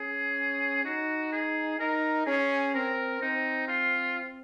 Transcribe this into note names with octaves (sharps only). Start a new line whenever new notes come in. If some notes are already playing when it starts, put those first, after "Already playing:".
Already playing: C#4 G#4
D#4 F#4
G#4
D#4 A#4
C#4 G#4
C4 A#4
C4 D#4
F4